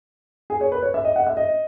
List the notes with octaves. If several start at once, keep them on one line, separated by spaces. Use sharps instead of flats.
G#4
C#5
B4
C#5
E5
D#5
F#5
E5
D#5